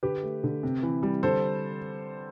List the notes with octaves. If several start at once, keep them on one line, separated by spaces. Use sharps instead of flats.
D3 G4 B4
A3
D3
C3
E3
G3
D3 A4 C5